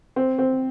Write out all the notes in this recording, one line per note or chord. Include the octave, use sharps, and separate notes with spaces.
C4
C4